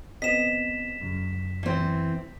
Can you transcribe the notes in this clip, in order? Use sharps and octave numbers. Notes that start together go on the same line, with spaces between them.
B3 C4 D#5 B6 E7
F#2 C#3
E3 C4